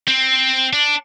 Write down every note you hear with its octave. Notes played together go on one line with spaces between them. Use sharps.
C4
D4